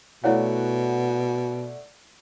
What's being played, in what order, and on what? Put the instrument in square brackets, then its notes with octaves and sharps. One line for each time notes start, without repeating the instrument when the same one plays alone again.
[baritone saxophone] B2 [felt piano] A3 D5 F#5 [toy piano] E4 C#5 F5